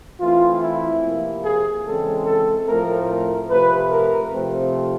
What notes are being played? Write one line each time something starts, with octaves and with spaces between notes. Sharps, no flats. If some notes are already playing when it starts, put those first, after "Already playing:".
E3 A3 C4 F4
E4
C3 F3 A#3
G#4
C#3 E3 G#3 C4 A4
A4
A2 F3 A3 C4 A#4
A#4
C3 F3 A3 B4
A#4
C3 F3 A3 C4